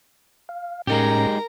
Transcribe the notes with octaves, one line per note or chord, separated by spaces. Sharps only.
F5
A2 G#3 C#4 D#4 G4 A#4 A#5